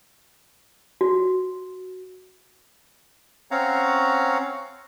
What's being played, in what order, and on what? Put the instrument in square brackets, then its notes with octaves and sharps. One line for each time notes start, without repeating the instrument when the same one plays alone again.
[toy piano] F#4
[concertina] C4 C#4 C#5 F5 F#5 A#5